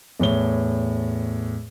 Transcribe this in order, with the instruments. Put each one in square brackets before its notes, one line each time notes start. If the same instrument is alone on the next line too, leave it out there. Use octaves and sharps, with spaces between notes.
[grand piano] E2 A2 C#5 G7